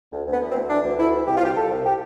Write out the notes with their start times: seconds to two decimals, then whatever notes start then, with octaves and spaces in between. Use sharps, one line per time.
0.12 D2
0.27 D2
0.32 B3
0.41 E3
0.51 C4
0.55 D2
0.70 E3 D4
0.84 D2
0.98 D2 E4
1.14 E3
1.27 C2 G4
1.37 F4
1.42 C2 G4
1.56 C2 A4
1.71 C2
1.85 G4